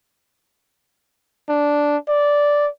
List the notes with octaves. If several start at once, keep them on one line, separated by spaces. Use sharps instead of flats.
D4
D5